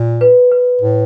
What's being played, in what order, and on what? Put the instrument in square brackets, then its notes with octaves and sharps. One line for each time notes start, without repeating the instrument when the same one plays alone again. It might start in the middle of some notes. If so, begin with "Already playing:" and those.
Already playing: [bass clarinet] A#2
[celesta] B4
B4
[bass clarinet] A2